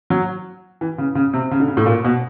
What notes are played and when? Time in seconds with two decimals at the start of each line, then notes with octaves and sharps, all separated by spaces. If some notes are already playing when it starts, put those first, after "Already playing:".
0.10 F#3
0.81 E3
0.98 C#3
1.15 C#3
1.33 C3
1.51 C#3
1.60 D3
1.68 C#3
1.77 A2
1.86 A#2
2.05 B2